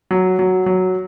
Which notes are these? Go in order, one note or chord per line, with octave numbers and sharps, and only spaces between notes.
F#3
F#3
F#3